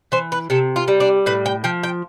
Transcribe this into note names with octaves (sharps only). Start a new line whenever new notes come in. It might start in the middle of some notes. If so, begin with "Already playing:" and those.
E3 C5
B4
C3 A4
F4
G3
D4
A2 B4
G5
F3 G5
G5